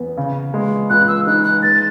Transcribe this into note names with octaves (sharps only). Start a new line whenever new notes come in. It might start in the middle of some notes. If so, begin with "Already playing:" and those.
Already playing: E2 B3
C#3
G#3
C#2 F#6
E6
D#4 F#6
F#6
G#3 A6